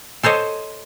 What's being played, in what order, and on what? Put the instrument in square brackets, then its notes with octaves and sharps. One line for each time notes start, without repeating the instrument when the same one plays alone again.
[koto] A4 C5 C#5 D#5